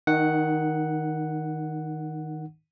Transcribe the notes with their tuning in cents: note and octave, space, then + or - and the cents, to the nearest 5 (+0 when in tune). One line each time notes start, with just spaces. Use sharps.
D#3 +10 D#4 -30 F#5 +0